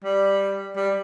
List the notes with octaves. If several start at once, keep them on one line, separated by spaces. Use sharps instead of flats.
G3
G3